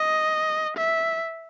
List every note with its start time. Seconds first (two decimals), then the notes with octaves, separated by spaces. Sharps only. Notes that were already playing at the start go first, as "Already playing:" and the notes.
Already playing: D#5
0.77 E5